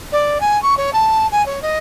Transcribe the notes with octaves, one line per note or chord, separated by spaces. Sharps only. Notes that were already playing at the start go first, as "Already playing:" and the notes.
D5
G#5
C#6
C#5
A5
G#5
C#5
D#5